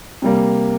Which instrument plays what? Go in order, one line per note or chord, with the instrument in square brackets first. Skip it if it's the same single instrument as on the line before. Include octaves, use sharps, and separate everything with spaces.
[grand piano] C3 G3 A#3